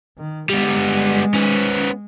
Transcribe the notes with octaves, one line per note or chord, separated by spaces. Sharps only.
D#3
G3 G#3 B3
B3 C#4